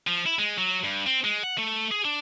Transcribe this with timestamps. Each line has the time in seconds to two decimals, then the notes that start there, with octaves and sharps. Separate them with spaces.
0.07 F3
0.26 E4
0.39 G#3
0.58 F#3
0.84 G2
1.06 C4
1.24 G#3
1.43 F#5
1.58 A3
1.91 G#4
2.05 D4